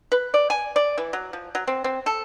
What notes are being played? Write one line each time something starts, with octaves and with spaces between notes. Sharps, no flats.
B4
D5
G#5
D5
E3
F#3
F3
F#3
C4
C4
A4